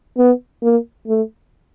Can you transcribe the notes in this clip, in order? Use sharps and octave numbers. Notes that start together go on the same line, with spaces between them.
B3
A#3
A3